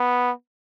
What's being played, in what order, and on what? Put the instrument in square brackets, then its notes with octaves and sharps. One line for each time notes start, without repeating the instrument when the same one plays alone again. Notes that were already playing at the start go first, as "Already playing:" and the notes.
Already playing: [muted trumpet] B3